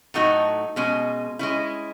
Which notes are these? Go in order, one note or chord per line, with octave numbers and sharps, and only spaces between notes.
A2 F#3 A3 D#4 F#4
B2 G#3 C#4
G#3 C#4 E4